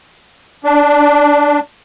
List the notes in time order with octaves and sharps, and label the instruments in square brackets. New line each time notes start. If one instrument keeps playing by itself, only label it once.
[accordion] D4